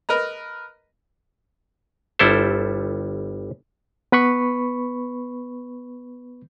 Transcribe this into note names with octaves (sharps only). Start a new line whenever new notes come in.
A#4 B4 D#5 A#5
G1 G3 E4 A4 C5
B3 B4 B5 C#6